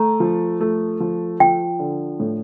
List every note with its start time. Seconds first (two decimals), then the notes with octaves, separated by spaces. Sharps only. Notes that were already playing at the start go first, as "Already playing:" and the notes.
Already playing: A3 A#5
0.20 F3
0.60 A3
1.00 F3
1.40 F3 G5
1.80 D3
2.20 A2